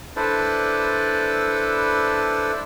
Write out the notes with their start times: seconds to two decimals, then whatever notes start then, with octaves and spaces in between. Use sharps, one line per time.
0.16 D4 E4 A4 B4 C5 D5